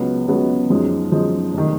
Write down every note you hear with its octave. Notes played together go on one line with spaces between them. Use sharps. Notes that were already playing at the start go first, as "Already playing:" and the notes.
Already playing: C#2 C#3 F#3 B3
C#2 C#3 F#3 B3
F#2 F3 G#3 D#4
F#2 F3 G#3 D#4
F1 D#3